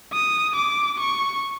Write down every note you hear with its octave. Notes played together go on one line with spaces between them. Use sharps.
D#6
D6
C#6